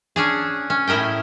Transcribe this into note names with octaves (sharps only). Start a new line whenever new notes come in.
C#4 D4 G#4
C#4
A2 E4 A#4 D#5 G5